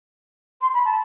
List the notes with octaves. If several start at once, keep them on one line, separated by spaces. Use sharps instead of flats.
C6
B5
A5